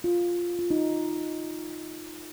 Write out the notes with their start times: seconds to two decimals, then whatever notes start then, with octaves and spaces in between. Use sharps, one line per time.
0.04 F4
0.59 F4
0.71 D#4